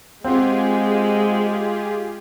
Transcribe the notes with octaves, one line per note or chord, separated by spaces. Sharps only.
G#3 C4 F4 G4 G#4 F#5